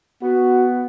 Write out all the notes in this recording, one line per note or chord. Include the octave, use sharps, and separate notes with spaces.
B3 F#4